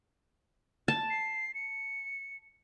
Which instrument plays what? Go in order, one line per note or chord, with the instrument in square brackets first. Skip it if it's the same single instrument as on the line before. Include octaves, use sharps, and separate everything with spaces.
[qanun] A5
[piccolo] C7
C#7